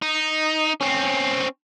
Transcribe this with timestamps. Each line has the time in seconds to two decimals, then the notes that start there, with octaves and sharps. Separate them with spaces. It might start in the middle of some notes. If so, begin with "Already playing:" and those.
0.02 D#4
0.81 C4 C#4